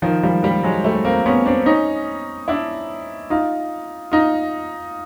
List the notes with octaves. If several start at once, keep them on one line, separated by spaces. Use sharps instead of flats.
D#3 F3
F3 G3
F3 G3
F#3 G#3
G3 A3
A#3 C4
B3 C#4
C4 D4
C#4 D#4
D4 E4
D#4 F4
D#4 F4